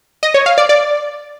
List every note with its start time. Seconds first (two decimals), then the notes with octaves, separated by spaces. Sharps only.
0.23 D#5
0.34 C#5
0.46 F5
0.58 D5
0.69 D5